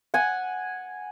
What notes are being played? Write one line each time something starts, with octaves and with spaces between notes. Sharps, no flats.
F#5 G#5